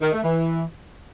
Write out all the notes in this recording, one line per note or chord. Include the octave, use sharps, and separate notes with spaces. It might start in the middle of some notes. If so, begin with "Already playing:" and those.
D#3
A3
E3